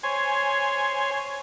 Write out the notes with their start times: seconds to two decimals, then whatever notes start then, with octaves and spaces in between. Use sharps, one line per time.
0.03 C5 C#5 G#5